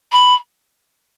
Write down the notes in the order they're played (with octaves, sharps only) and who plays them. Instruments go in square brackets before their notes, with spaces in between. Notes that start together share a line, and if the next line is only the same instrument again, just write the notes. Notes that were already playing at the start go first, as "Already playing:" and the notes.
[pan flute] B5